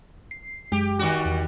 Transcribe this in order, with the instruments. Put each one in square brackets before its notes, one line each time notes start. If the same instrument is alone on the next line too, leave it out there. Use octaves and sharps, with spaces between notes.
[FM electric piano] C7
[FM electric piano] F#2 G#3 [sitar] G4
[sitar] D#3 G3 F#4
[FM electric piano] E2